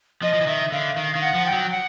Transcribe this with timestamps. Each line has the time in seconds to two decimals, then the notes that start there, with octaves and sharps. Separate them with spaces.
0.22 F3 D#5
0.33 F3
0.41 E3
0.47 D#3 E5
0.72 D3 F5
0.97 D#3 F5
1.15 D#3
1.22 F#5
1.34 F3
1.46 G5
1.52 F#3
1.71 F#5